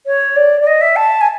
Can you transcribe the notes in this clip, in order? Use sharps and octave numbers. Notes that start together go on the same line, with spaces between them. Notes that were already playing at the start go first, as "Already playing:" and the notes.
C#5
D5
D5
D#5
E5
A5
G#5